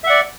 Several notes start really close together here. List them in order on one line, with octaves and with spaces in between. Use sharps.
E5 F#5 D5